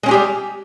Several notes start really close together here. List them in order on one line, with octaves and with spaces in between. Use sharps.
G#3 C#4 G#4 G4 G3